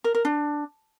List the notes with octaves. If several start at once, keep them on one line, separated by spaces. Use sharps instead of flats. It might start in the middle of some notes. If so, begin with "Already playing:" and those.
A#4
A#4
D4